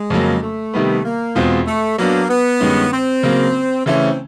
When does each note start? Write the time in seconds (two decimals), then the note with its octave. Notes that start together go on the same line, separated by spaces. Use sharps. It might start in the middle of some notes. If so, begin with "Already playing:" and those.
Already playing: G#3
0.10 F2 C#3 F#3 A#3
0.42 A3
0.74 C3 D#3 G3 B3
1.04 A#3
1.35 E2 B2 G#3 C4 F4
1.67 A3
1.98 F#3 A#3 B3 D4
2.29 B3
2.60 G2 D#3 G#3 C#4
2.92 C4
3.23 C#3 F#3 A#3
3.85 C#3 E3 A3 C4 C#4